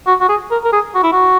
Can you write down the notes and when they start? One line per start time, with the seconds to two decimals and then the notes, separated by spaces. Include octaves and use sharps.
0.07 F#4
0.21 F#4
0.29 G#4
0.51 A#4
0.64 A#4
0.73 G#4
0.95 F#4
1.03 E4
1.13 F#4